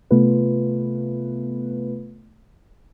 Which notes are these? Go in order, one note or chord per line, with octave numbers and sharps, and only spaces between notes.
C3 A3 B3 F4 B4